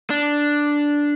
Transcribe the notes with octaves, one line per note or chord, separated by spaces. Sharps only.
D4